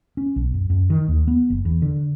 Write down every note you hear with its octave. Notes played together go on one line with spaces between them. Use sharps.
C#4
B1
F#2
F#2
D#3
D#2
B3
F#1
E2
D3